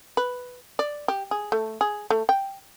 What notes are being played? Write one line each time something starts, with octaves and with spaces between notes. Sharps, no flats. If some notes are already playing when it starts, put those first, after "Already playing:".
B4
D5
G4
G#4
A3
G#4
A3
G5